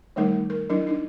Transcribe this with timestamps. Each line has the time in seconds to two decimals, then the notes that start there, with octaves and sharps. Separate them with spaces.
0.16 D#3 G3 A3 D#4 A#4
0.50 A#4
0.70 F#3 D4 E4 A#4
0.87 D4 D#4